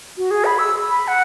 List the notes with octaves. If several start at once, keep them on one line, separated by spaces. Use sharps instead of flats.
F#4
G#4
B5
E6
B5
F#5